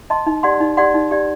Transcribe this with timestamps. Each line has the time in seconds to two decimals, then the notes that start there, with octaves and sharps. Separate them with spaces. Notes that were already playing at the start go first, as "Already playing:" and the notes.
0.10 D#5 A5 C6
0.26 D#4
0.43 G4 D5 F#5 C6
0.60 D#4
0.77 G4 D5 F#5 C6
0.94 D#4
1.11 G4 D5